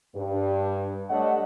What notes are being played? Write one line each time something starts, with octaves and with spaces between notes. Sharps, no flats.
G2
G3 A3 D4 C#5 D#5 F#5